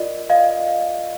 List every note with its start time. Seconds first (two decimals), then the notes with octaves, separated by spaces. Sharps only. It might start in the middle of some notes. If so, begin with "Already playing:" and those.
Already playing: F4 A#4 D5 D#5
0.30 D#5 F5